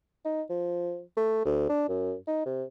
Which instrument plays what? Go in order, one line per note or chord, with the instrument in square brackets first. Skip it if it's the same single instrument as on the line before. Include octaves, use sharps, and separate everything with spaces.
[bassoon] D#4
F3
A3
D2
D4
F#2
D#4
C3